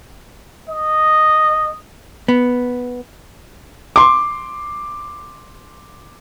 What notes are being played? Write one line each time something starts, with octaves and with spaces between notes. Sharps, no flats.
D#5
B3
C6 D6